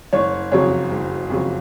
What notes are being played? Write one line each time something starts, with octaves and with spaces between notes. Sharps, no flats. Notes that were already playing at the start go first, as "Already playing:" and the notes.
F#1 C#5
F2 C#3 F#3 C#5
F#1
F2 C#3 F#3